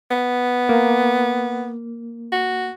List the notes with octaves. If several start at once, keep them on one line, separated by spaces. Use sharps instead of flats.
B3
A#3
F#4